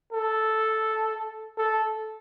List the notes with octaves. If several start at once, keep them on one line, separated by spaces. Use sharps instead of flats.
A4
A4